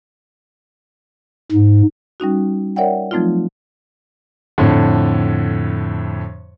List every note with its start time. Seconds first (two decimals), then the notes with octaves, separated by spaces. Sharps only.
1.52 G#2
2.20 G3 C#4 D#4 F#4
2.76 A#4 C#5 D5 E5 F#5 G5
3.11 F3 F#3 A3 C4 D#4 F4
4.58 F2 A2 D3